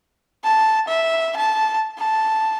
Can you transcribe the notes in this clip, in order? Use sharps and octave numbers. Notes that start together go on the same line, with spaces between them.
A5
E5
A5
A5